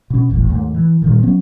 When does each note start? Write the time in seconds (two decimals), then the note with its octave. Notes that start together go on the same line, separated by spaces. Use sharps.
0.10 B2 C#4
0.29 D#1 G#1 E2 A2
0.49 D#2 G#2 A3
0.74 E3
1.02 G2 A#2 D#3
1.23 F#3 B3 C#4